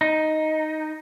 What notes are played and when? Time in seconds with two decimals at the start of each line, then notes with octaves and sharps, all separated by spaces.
0.01 D#4